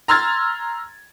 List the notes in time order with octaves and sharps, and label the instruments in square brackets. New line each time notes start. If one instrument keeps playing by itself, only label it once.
[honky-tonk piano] A#5 C6 E6 F6 G#6 A6